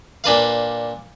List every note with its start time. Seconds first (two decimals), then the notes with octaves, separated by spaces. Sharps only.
0.24 A#2 D4 B4 F5